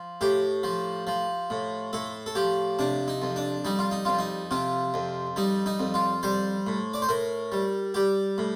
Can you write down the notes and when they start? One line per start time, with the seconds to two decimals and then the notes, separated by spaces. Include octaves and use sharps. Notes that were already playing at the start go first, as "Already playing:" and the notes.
Already playing: F3
0.21 A2 G4
0.63 F3
1.07 F3
1.50 A2
1.93 A2 A4
2.26 A4
2.35 F3 G4
2.79 C3 D4
3.08 D#4
3.22 F2
3.36 D4
3.65 G3 D#4
3.79 F4
3.91 D#4
4.05 F2 F4
4.18 D#4
4.51 C3 F4
4.94 F2
5.36 G3 D#4
5.66 D#4
5.79 F2
5.94 F4
6.23 G3 C5
6.67 A2
6.94 D5
7.02 C5
7.09 A2 A#4
7.52 G3
7.94 G3 G4
8.38 A2